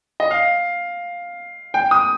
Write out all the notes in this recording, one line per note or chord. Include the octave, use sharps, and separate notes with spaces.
D#5
F5
G5
D#6